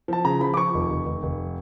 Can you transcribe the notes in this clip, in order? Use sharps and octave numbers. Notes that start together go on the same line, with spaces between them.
F3 A5
C#3 A#5
F3 B5
D6
F3 C#6
F1
F1
F1
F1